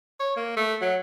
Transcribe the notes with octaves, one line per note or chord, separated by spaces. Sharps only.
C#5
A#3
A3
F#3